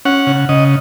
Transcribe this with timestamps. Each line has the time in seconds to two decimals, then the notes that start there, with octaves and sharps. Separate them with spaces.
0.05 C#4 F#5
0.27 C#3
0.49 C#3 D#5